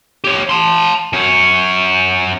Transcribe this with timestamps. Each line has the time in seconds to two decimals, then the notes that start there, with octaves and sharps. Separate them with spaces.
0.24 G4 C#5
0.49 A5 C6
1.13 F#2 C#4